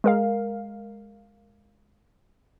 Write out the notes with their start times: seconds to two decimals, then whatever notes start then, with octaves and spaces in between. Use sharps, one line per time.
0.04 G#3 A#4 F5